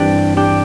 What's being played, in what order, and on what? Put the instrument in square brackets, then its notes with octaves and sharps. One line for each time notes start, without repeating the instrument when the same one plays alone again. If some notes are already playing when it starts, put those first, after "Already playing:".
Already playing: [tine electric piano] G2 E3 C4 [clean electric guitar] D4 G4
[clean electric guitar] D4 G4